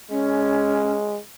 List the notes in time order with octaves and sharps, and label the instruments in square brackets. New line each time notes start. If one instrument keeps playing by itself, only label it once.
[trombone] G#3 [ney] C#4